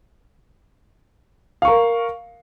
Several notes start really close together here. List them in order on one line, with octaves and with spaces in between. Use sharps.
F5 C#6 A#4